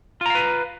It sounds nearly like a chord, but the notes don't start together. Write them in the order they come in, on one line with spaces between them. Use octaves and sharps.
F4 A#5 F5 B4